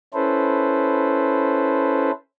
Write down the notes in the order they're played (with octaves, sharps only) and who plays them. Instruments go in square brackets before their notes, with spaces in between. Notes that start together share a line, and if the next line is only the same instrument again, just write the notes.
[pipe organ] C#4 E4 A4 B4 C5